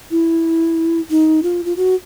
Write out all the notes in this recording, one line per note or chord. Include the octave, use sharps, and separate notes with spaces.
E4
D#4
F4
F4
F#4